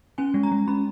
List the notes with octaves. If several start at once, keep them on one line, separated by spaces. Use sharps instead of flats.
C#4 G#5
G#3
A#5
G#3
C#4 B5